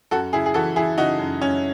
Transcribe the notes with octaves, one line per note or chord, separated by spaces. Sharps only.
F#2 F#4 A4
C#3 E4 G#4
G#4
E3 F#4 A4
E3 E4 G#4
C#3 D#4 F#4
F#2
F#2 C#4